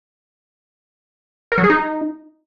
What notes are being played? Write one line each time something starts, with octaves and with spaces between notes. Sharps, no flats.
A#4
F#3
G#4
D#4